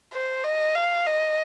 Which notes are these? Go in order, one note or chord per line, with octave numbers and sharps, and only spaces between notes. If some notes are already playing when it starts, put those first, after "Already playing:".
C5
D#5
F5
D#5